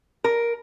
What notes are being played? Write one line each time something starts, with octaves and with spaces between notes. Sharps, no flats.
A#4